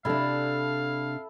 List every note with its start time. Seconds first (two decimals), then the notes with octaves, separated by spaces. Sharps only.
0.05 C3 D4 E4 A4 F5